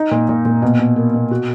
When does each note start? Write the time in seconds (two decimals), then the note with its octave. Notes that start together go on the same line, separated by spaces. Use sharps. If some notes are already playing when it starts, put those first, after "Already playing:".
Already playing: D#4
0.11 A#2
0.29 A#2
0.45 A#2
0.62 B2
0.79 B2
0.96 A#3
1.14 B2
1.31 F#4